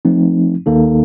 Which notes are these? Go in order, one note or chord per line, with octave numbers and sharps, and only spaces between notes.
F3 A3 C4 D#4
D#2 D#3 A#3 D#4 A4